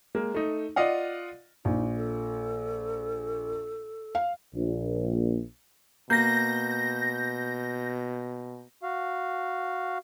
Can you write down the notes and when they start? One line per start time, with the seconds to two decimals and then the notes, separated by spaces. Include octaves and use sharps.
0.15 G#3 A#3
0.35 A3 D#4
0.76 F4 D5 D#5 F5 F#5
1.65 A#1 D#4
1.97 A4
4.15 F5
4.54 A#1
6.10 B2 A#3 G6 A#6
8.83 F#4 F5